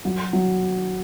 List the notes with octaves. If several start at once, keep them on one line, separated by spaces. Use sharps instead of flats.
F#3 F#4
F#3